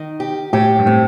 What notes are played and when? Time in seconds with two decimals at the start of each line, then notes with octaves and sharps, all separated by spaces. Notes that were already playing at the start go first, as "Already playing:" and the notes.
Already playing: D#3
0.20 G4
0.53 A2 G4
0.79 G2
0.86 A2 C4